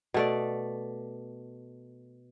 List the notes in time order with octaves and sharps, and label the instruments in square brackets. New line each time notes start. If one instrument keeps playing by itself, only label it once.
[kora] B2 A3 D5